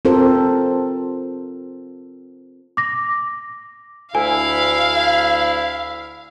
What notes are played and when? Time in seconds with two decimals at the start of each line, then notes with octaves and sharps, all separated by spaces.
0.05 C4 F4 A4 A#4 C5
2.77 D6 A#6
4.15 D2 E4 F5 G#5